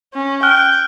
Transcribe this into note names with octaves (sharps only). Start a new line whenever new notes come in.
C#4
G5 F6 F#6